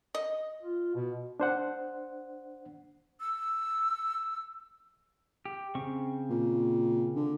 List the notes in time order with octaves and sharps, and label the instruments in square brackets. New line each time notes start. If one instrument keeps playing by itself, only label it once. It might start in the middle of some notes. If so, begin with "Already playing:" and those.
[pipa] D#5
[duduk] F4
B2
[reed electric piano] D4 C5 F#5
[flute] E6
[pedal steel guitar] G4
C#3 C4 C#6
[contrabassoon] A#2
D3